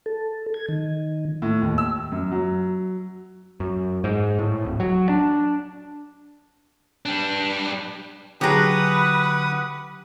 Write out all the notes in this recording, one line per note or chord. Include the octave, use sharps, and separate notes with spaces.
A4
G#6
D#3
A2
D#2
E6
F#2
F#3
F#2
G#2
A2
D1
F#3
D4
G3 D4
D3 F#3 G4 G#4 B4 F#5 A#5 D#6